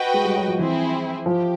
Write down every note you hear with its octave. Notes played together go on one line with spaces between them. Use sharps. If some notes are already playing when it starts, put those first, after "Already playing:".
Already playing: F#4 B4 D#5 G5
G#3
G3
F#3
F3
E3 C4 E4 G#4 C5
F3 G4